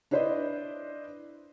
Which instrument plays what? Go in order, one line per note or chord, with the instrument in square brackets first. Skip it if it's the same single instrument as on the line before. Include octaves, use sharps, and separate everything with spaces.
[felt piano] D4 E4 B4 C5 D5 D#5